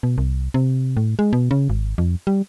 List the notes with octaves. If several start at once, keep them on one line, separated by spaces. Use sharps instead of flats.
B2
C2
C3
A2
G#3
B2
C#3
G#1
F2
G3